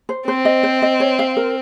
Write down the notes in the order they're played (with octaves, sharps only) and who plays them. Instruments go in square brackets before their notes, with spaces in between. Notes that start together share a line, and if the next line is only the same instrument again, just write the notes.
[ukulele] C5
[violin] C4 [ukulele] C5
[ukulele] D#5
C5
D#5
C#5
F5
A#4